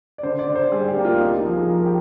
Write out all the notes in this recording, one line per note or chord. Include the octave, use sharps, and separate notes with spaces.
D5
D3 C5
D5
D3
C5
G3 G#4
G4
A#3
F4
C2 D#4
F4
F3
G#4
F3 A#4
G4